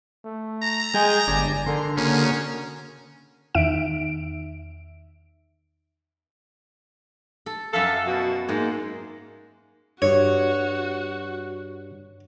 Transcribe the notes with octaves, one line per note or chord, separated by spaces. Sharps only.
A3
A#5
G#3 G#4 G5 G#5
G1 D4 G#5
D3 A#4 C6
C#3 A#3 C#4 F#4
E2 D#3 D#4 E5 D7
A4
F#2 A4 E5 F5
B2 F#4
G#2 G#3 A#3
G2 F#4 C#5